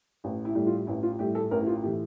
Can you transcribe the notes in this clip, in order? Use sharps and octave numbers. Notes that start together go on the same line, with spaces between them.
A1
E4
A2 G3
F4
A1 E4
F4
A2 G3 G4
A4
A1 A#4
E4
F4
A2 E3 G4